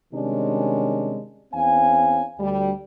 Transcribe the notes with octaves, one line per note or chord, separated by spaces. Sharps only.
C3 D#3 G3 G#3 C#4 D4
E2 C4 C#4 F5 G#5
D2 G3